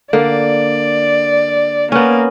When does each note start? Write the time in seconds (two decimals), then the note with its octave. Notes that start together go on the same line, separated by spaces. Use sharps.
0.13 D3 A#3 D5
1.92 A#3 B3 C#4